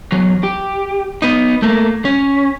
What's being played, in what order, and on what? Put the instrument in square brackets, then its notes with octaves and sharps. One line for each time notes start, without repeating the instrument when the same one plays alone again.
[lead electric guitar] E2 F#3
G4
B3 D#4
A3 A#3
C#4